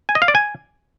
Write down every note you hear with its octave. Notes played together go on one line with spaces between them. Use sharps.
G#5
D#5
F5
D5
G#5